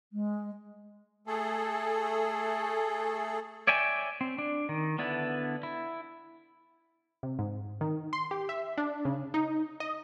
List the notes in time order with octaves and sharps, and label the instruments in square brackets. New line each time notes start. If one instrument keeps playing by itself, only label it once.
[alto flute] G#3
[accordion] A3 G#4 A4
[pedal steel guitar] C#5 D5 E5 G5 G#5
C4
D4
D#3
D3 B3 D4 E4
E4
[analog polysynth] C3
G#2
D#3
C6
G4
E5
D4
C#3
D#4
D#5